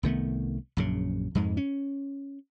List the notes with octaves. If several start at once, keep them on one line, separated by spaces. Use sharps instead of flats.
C2 D#3 A3 B3
A#1 F#2 C#3
F2 G#2 G#3
C#4